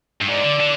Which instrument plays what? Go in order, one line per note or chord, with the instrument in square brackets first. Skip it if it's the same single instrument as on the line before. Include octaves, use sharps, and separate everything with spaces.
[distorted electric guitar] G2
[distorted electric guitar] G#2 [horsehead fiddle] D5
[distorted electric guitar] D3
D3